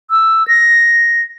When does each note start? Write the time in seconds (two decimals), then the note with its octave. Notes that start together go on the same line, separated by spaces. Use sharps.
0.11 E6
0.48 A#6